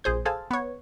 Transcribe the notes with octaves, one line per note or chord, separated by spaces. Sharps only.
A#1 G#4 C5 G6
G#4 A4 C5 F5 G#5 A5
B3 C#5